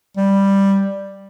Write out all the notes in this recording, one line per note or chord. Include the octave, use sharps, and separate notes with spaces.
G3